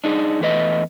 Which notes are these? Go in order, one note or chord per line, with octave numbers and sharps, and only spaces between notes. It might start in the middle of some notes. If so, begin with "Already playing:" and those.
D4 D#4 G#4
E2 A3 B4 D#5